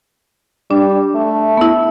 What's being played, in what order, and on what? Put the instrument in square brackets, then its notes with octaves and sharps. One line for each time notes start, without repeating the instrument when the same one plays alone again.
[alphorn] G3 [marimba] D4
[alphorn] A3
[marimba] B3 E4